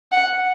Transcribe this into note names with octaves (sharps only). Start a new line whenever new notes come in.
F#5